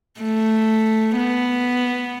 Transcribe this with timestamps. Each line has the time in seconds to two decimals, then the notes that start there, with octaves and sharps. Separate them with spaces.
0.21 A3
1.16 B3